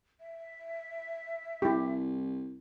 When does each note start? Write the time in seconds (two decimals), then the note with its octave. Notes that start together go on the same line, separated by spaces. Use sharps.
0.21 E5
1.62 C2 E4 G4